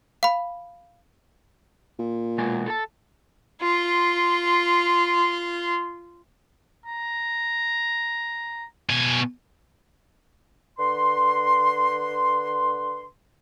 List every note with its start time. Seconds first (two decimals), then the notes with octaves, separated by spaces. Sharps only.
0.23 F5 B5
1.99 A#2
2.38 B2 G#3 G#5
2.66 A4 A5
3.61 F4 C6
6.86 A#5
8.90 B2 G#5
10.79 D3 B4 C6